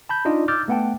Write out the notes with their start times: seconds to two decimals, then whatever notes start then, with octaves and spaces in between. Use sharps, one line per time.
0.09 A5 B5 G6
0.25 D4 D#4 F4 D#5
0.48 D6 E6 F6 G6 A6
0.68 A3 B3 F#5 G5 A5